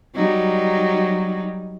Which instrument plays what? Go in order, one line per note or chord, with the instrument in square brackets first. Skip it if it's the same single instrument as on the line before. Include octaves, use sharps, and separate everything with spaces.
[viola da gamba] F#3 G3 D#4